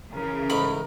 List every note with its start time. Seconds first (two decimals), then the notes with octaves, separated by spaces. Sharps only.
0.14 C#3 E3 A#4
0.50 G#2 A3 D#4 B5